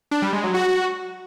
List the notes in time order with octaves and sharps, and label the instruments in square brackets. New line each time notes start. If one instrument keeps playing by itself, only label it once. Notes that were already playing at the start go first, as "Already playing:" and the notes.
[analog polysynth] D4
G3
G#3
F#3
F#4